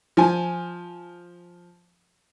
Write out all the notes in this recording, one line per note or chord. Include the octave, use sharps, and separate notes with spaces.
F3 G#5